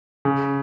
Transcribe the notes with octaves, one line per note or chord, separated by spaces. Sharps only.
C#3